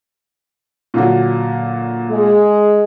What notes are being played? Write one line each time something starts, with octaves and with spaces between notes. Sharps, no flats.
A#2 D3 F#3
G#3